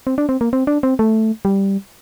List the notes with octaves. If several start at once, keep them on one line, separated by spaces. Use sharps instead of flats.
C4
D4
C4
A#3
C4
D4
C4
A3
G3